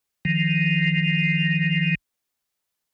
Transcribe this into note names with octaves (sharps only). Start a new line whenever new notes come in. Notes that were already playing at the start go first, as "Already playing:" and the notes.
D#3 F3